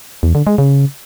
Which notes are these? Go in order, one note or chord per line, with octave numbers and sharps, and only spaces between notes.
E2
D3
G#3
C#3